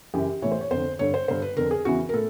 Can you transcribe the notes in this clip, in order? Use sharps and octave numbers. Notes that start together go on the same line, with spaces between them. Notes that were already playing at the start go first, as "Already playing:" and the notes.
F#2 C#3 E3 G4
A2 E3 C#5
C5
C#5
F2 D3 C5
G2 D3 C#5
C5
G2 D3 C5
B4
F2 D3 A#4
G#4
E2 C#3 E3 F#4
A#4
A2 A4